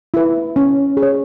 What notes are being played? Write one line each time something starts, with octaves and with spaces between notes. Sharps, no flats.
E4 B4
C#4
G#4
C#5